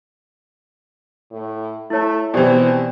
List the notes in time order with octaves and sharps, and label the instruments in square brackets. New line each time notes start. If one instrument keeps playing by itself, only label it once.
[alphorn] A2
[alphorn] A3 [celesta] E4 C#5
[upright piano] B2 E3 [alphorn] C4 [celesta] G4 D5